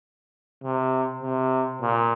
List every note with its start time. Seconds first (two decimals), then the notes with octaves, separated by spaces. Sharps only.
0.63 C3
1.22 C3
1.82 A#2